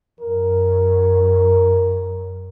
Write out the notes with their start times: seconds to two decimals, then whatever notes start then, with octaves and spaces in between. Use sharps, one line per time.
0.21 F#2 A#4